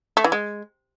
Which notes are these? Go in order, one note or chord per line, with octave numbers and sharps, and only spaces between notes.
A3
E3
G#3